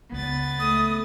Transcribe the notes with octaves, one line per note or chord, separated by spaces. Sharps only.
C#2 B3 A6
A3 D#6